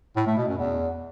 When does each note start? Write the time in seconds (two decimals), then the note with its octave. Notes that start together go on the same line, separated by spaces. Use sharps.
0.16 A2
0.27 A3
0.37 B2
0.47 F#2
0.58 E2